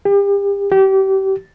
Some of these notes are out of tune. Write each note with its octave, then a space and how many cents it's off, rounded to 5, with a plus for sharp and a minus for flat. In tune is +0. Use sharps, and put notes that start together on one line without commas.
G4 +35
G4 -30